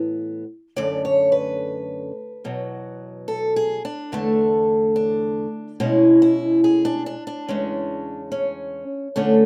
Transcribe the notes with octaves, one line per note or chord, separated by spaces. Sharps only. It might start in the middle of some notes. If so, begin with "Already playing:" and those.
Already playing: A2 E3 B3
F#2 D3 A3 C#4 D5
C#5
B4
E2 B2 F#3
A4
G#4
D4
E2 D3 A3
D4
B2 G#3 C#4 E4
E4
G#4
D4
D4
D4
E2 C#3 G#3 C#4
C#4
D2 D3 A3 C#4 D4